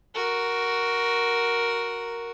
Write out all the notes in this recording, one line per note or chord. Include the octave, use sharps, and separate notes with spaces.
F#4 A#4